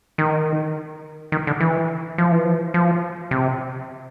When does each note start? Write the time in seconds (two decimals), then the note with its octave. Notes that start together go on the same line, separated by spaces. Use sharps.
0.18 D#3
1.32 D#3
1.47 D3
1.61 E3
2.18 F3
2.31 E3
2.45 F3
2.74 F3
3.31 C3